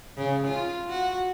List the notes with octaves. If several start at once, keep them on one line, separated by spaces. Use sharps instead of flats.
C#3
F4
F#4